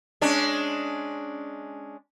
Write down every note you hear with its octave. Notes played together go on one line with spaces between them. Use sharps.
G#3 C#4 D4